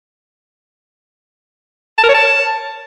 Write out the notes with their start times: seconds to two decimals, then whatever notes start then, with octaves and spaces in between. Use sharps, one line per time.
1.98 A5
2.04 A#4
2.09 C#5
2.14 A5